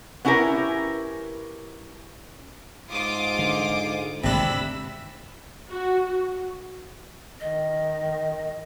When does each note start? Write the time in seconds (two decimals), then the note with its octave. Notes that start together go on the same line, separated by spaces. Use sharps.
0.25 B3 C#4 E4 G4 A#4 B4
2.92 G#2 F4 D6 D#6
3.39 D3
4.24 G#1 D2 G2 C3 D4 B5 E6
5.70 F#4
7.41 D#3 D#5